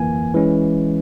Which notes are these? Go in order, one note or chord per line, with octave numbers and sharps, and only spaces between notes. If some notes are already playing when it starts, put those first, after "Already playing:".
Already playing: G1 F2 E3 A#3 G#5
E3 G#3 C#4